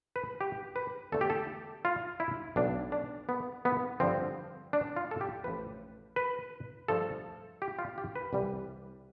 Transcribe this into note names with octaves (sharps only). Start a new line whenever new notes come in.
B4
G4
B4
E2 D3 A3 A4
G4
A4
F4
E4
B1 A2 E3 D4
D4
B3
B3
G2 D3 F3 C4
D4
F4
A4
G4
A1 A2 F3 B4
B4
G2 F3 A3 A4
G4
F4
G4
B4
C2 C3 E3 G3